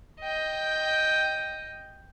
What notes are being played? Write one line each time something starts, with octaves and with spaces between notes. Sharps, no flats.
D#5 G5